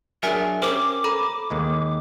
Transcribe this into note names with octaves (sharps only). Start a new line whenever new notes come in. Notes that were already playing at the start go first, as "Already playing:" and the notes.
F#3 D4 G#4 A#4 E5 G#5 B6
C#4 G4 A#4 C5 D6
A4 A#5 B5
D#2 D#3 G#3